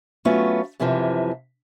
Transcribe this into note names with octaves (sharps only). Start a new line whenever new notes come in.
F#3 A3 B3 C#4 F4
F#2 C3 E3 F3